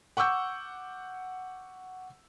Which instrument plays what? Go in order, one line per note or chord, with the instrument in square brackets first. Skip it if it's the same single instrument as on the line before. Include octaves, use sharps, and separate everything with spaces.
[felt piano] F#5 C#6 D6 E6 G6